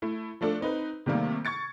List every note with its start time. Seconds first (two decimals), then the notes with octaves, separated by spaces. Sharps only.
0.02 A3 E4
0.41 F3 A3 D4 A4
0.61 C4 D#4 B4
1.06 C3 D#3 G3 A3 A#3
1.45 C#6 G#6 A6 C#7